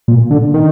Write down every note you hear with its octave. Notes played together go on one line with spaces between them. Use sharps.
A#2
D3
D#3